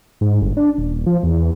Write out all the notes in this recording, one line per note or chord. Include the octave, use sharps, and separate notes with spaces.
G#2
G1
D4
D#1
F3
E2